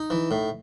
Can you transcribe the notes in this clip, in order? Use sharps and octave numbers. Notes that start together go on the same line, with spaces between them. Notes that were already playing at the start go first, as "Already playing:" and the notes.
Already playing: D#4
E3
A2